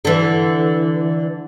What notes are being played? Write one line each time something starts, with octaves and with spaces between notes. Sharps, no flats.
D3 E3